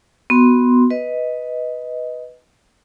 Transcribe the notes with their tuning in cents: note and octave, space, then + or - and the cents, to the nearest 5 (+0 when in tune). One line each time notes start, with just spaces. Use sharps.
B3 +0 F#4 +0 C6 +5
B4 +0 D#5 +10